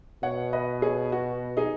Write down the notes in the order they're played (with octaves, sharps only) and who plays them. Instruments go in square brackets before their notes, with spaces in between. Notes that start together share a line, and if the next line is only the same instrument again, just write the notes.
[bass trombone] B2 [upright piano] C#5 F#5
[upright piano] B4 D#5
G#4 C#5
F#4
D#4 G#4